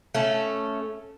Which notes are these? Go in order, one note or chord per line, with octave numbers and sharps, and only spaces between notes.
A3 C#4